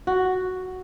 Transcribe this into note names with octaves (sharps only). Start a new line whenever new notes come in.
F#4